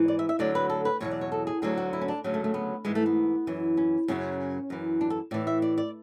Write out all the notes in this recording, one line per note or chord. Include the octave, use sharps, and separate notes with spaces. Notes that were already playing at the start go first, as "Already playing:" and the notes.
Already playing: G#2 E3
D5
E5
E5
D2 D3 F#3 D5
B4
A4
B4
E2 B2 F#3 C#5
D5
C#5
A4
G#4
D2 D3 F#3 G#4
F#4
E4
C#4
D4
D2 C#3 F#3
A3
A3
B3
G#2 E3 G#3
A3
B3
F#2 E3
C#4
F#2 C#3 F#3 C#4
F#2 E3
D4
A4
A2 E3 D5
E5
D5
D5